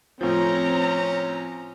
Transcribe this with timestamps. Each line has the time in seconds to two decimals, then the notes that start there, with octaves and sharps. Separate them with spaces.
0.21 A2 F3 C4 C#4 A#5